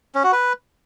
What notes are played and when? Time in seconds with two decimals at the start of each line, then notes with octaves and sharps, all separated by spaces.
0.15 C#4
0.24 F#4
0.32 B4